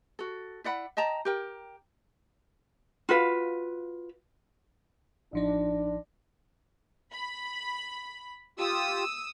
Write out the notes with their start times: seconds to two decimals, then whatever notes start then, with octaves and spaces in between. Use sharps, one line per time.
0.19 F#4 A4
0.64 E4 D5 F#5 B5
0.97 D#5 G5 A5 A#5
1.25 G4 A#4 G5
3.09 F4 F#4 B4 F5
5.33 A1 F3 D4 D#4
7.12 B5
8.59 F4 G4 D#6 E6